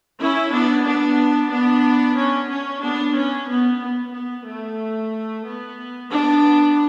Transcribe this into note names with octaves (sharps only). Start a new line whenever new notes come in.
C#4 E4
B3 D4
B3 D4
B3 D4
C#4
C#4
B3 D4
C#4
B3
B3
B3
A3
B3
B3 D4